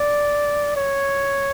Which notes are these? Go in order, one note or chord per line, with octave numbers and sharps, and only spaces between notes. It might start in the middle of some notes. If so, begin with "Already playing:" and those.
Already playing: D5
C#5